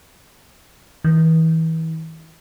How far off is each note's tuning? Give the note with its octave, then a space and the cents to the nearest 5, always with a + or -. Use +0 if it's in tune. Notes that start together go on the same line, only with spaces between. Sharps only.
E3 -35